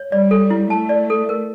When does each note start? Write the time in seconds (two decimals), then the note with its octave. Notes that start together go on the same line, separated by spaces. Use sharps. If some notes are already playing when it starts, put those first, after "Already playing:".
Already playing: C#5
0.12 G3 D5
0.31 A4
0.50 E4
0.70 A3 A5
0.89 D5
1.10 A4
1.29 A#4